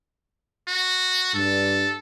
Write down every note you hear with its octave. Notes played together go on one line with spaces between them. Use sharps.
F#4
G2 A4